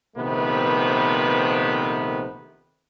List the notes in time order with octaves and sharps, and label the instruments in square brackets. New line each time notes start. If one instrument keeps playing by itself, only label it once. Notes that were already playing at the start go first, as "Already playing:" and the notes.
[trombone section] A#1 C3 D#3 A3 B3 B4